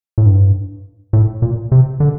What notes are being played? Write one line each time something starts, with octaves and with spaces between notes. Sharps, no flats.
A2
G2
A2
A#2
C3
D3